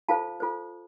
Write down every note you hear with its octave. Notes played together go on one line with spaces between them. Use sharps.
F4 A4 C5 F5 A5
F4 A4 C5